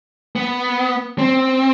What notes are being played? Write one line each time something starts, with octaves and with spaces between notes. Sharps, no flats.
B3
C4